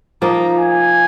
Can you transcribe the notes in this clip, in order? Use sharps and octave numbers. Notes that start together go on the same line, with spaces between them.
F3 A#3 D#4 A#5
G#5